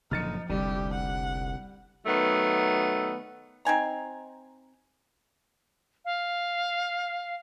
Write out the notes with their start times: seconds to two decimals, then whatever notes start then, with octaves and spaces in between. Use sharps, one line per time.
0.11 F#1 A#2 D3 F3 D#4 F6 A6 C#7
0.49 F1 C2 D3 G3 G4
0.93 F#5
2.06 D#3 F#3 A3 B3
3.65 C4 D#4 G#5 A#5
6.05 F5